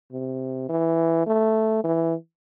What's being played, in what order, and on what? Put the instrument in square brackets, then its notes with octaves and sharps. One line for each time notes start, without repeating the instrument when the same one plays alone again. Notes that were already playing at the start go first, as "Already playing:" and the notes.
[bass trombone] C3
E3
A3
E3